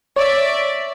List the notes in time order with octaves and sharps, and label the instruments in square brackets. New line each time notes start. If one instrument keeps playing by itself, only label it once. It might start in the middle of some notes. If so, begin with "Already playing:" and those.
[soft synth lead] C#5 [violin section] D5 E5